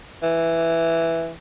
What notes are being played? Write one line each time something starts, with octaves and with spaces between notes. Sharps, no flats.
E3